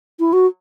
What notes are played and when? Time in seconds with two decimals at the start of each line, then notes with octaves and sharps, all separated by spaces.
0.20 E4
0.33 F#4